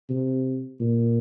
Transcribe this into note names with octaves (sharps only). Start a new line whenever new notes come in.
C3
A#2